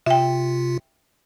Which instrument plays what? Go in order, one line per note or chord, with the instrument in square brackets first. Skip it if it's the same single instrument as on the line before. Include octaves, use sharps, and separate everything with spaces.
[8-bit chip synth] C3 F4 [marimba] E5 G5